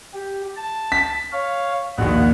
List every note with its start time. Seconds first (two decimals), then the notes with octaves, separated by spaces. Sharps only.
0.14 G4
0.57 A5
0.92 B6
1.32 C#5 F5
1.98 A#1 D#2 F#4 D#5 F#5